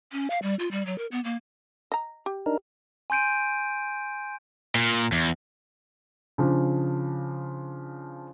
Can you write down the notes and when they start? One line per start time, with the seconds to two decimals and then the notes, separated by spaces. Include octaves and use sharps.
0.12 C#4
0.30 F5
0.43 G3
0.59 F4
0.71 G3
0.86 F#3
0.98 A#4
1.12 B3
1.24 A#3
1.92 D#5 A#5
2.26 G4
2.46 D4 D#4 A#4
3.10 G#5 C6 G6 D7 D#7
4.75 A#2
5.12 E2
6.38 C#3 F3 D4